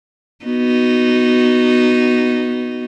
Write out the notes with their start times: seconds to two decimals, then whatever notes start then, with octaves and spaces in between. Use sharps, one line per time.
0.45 B3 D#4 F#4